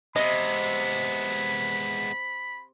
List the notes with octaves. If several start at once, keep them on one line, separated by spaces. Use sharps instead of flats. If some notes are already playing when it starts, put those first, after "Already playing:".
C3 G#3 B3 D#5 B5